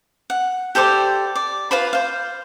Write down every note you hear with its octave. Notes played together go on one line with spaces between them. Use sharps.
F#5
G4 A4 C5 D5
D5
F4 B4 C5 B5
C5 F5